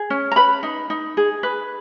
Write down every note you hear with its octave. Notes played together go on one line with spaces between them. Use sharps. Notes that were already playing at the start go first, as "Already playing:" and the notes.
Already playing: G#4
C#4
A#5
B4 B5
D#4
D#4
G#4
B4